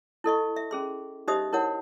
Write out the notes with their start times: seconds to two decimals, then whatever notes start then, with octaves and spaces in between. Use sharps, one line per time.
0.24 E4 A4 D#5 C#6
0.56 E5
0.71 C#4 G#4 C6
1.28 D#4 G4 C5 D#5 E5 D#6
1.53 E4 A#4 C#5 F#5